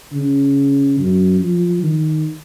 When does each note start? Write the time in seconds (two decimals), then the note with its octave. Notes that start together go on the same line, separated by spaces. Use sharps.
0.13 C#3
0.99 F#2
1.41 F3
1.83 D#3